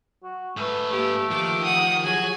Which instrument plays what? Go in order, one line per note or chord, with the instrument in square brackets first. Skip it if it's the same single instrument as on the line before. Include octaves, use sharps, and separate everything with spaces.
[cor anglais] F#4
[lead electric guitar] G#2 B4 [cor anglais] A3
[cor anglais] A3 [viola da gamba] A#3 [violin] G4
[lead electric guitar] D#3 [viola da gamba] F3 G4 [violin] D6
[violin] F#5 D#6
[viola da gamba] F#3 G#4 [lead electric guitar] F#4 [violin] G#5